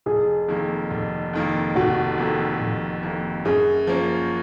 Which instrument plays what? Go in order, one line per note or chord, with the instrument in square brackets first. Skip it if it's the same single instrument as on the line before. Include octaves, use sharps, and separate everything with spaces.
[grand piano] F1 [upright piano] G#4
[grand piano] F2 D#3 A#3
F1
F2 D#3 A#3
[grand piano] F1 [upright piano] F#4
[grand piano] F2 D#3 A#3
F1
F2 D#3 A#3
[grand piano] F#2 [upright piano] G#4
[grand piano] F3 A#3 C#4